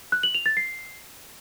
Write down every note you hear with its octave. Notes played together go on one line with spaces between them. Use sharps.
F#6
F#7
F7
A6
C7